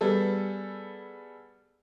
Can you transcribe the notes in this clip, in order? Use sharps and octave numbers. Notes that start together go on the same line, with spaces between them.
G3 B3 G#4 A4